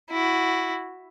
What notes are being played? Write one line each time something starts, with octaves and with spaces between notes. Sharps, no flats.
E4 F#4